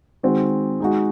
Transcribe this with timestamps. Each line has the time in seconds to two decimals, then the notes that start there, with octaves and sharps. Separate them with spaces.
0.23 D#3 G#3 C4 F#4
0.80 G#3 D#4 F#4